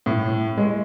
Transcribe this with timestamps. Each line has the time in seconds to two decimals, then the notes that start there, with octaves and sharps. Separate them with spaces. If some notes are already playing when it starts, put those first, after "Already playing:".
0.06 A2
0.57 G#3